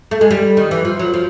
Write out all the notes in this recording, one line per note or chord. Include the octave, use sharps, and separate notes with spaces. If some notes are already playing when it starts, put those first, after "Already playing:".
A3
G#3
G3
D#3
E3
F3
F#3
F3